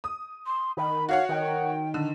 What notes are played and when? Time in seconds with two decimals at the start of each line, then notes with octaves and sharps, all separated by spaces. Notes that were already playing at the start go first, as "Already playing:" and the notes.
0.04 D#6
0.46 C6
0.77 D#3 B5
1.09 F#4 C#5 F5 F#5
1.29 D#3 G5
1.94 D3